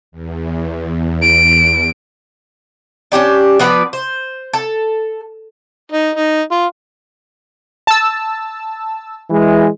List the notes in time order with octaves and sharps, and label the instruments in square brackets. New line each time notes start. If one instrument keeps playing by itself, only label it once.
[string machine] E2
[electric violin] D7
[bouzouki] C#4 D4 G4 D5
F3 B3 B4 D5
C5
A4
[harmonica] D#4
D#4
F4
[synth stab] A5 E6
[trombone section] E3 G#3